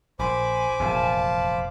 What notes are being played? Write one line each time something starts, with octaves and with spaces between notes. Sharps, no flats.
A#1 C5 G#5 B5 D6
F1 A#1 E2 F5 A5